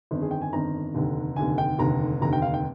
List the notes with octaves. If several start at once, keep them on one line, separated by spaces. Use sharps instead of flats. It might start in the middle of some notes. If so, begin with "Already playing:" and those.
G1 F2 D#3
G#4
G5
G#5
G1 F2 D#3 A#5
F1 D#2 D3
F1 D#2 D3 G#5
G5
F1 D#2 D3 A#5
F1 D#2 D3 A#5
G5
F5
G5